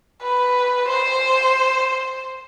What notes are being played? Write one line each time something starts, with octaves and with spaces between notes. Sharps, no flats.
B4
C5